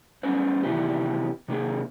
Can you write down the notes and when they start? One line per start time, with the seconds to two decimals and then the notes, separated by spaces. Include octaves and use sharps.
0.23 G3 C#4 B4 C5
0.63 C3 D#3 E3 B3 E4 G4
1.48 C3 D#3 A#3 G#4